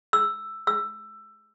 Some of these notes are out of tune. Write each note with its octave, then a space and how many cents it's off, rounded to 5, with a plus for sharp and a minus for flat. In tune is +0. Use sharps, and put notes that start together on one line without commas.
E6 +5
E6 +15